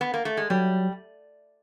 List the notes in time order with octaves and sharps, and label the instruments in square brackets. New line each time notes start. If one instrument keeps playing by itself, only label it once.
[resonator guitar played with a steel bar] B3
A#3
A3
G#3
[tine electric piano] F#3 [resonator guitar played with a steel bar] G3